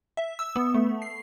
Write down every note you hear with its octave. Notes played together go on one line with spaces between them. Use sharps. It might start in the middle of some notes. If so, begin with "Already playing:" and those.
E5
E6
B3
A3
C7